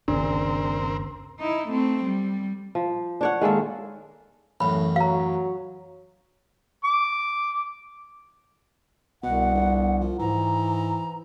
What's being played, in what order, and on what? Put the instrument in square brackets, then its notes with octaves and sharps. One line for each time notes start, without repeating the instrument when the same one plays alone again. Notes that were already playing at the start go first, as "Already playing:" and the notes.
[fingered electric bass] G1 D#2 C#3 [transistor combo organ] C4 A#4 [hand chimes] D4
[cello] D#4 E4
A3 C4
G3
[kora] F3
D4 C#5 F#5
D#3 G#3 A#3 A4
[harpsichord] A1 F#2 [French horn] A2 [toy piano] B5
[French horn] F#3 [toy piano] F5 A#5
[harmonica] D6
[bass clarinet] C2 [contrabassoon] B2 [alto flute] F#5
[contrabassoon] G1
F3
[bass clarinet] G#2 [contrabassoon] E3 [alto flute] A#5